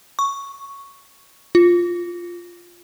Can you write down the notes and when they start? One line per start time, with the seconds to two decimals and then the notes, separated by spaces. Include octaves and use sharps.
0.19 C#6
1.55 F4